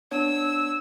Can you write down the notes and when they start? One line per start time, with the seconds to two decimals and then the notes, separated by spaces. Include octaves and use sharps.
0.11 B3 D4 C#5 E6